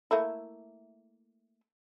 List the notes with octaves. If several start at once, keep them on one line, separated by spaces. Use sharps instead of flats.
A3 A#3 E4